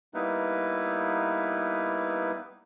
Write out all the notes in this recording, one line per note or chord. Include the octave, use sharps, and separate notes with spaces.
G3 A#3 B3 D#4 E4 B4